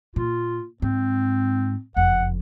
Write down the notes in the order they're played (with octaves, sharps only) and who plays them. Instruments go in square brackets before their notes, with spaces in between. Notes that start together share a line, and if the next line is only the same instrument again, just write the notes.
[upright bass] A#2 [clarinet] F4
[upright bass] G#2 [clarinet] C4
[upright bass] F#1 F2 [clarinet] F#5